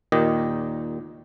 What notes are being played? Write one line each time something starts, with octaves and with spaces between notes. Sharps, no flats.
D#2 A#2 D#3 G4 D#5